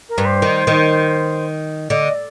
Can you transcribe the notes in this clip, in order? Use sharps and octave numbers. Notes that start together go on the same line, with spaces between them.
A#4
G2
C5
D#3
D#3
D3 D#5
D5